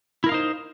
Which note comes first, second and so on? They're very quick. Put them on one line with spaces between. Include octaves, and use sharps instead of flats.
E4 A#4 F5 D#4 C5